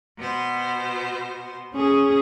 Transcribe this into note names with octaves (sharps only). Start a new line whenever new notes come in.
B2 B3 C5
C#4 G#4